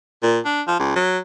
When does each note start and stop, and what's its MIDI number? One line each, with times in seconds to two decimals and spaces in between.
0.23 0.39 46
0.45 0.62 62
0.68 0.79 53
0.79 0.92 37
0.96 1.19 54